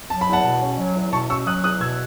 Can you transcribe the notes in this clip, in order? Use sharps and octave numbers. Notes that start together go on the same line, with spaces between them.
F#3 A5
B5
E2
F#5 A5
B2
C#4
F#3
E2
B2 A5 C#6
C#4 C#6 E6
F#3 D#6 F#6
E2 D#6 F#6
B2 E6 G#6